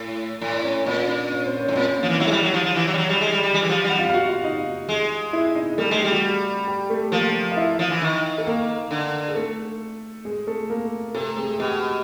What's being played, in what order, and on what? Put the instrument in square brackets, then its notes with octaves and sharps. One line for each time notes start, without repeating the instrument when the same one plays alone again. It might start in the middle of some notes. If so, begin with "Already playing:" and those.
Already playing: [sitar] A2
A2
[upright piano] D5
C#4 C#5
[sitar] A#2 [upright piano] C#4 C#5
[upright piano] D4 D5
C#4 C#5
C4 C5
C#4 C#5
[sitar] A2
[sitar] A#2 [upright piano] C4 C5
[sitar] F3 [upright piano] A#3 A#4
[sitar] E3 [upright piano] F5
[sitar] F#3 [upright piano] E4 E5
[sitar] G#3
G3
F#3
F3
F3
E3
F#3
G3
F#3
G3
G#3
G3
G3
G3
E3
F3
G3
[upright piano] F#5
F4 F5
F5
F#4 F#5
F4 F5
D#4 D#5
[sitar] G#3
[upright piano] E4 E5
D#4 D#5
[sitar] G3 [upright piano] A3 A4
[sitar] G#3
[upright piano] G4
[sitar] G3
[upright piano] F#4
G4
A3 A4
[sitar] F3 [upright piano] A#3 A#4
[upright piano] F5
E4 E5
[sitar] F3
E3
D#3
[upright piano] A4
A#3 A#4
[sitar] D3
[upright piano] G#4
A3 A4
G#3 G#4
A3 A4
A#3 A#4
[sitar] C3 [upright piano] A3 A4
[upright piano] G#3 G#4
G#4
[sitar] B2 [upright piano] G4